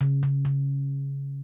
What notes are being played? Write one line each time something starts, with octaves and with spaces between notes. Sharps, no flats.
C#3
C#3
C#3